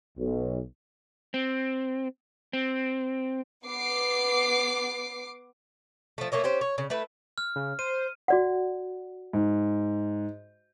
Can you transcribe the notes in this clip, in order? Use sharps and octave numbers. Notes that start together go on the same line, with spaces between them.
B1
C4
C4
B3 D6 C7
F3 A3
A3 A#3 C#5 D#5
C#4 G4 C5
C#5
C#3
A3 E4 B4
F6
C#3
C5 D#7
F#4 D5 F#5
G#2